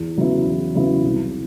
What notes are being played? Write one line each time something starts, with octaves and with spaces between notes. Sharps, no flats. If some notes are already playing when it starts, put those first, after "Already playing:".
Already playing: E2
C#3 F#3 B3 E4
E2
C#3 F#3 B3 E4
C2